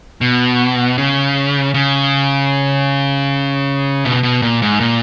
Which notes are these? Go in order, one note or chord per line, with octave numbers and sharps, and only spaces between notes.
B2
C#3
C#3
B2
B2
A#2
G#2
A#2